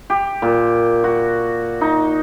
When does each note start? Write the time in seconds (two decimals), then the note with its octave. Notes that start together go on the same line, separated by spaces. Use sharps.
0.10 G4
0.42 A#2
1.04 F#4
1.81 D#4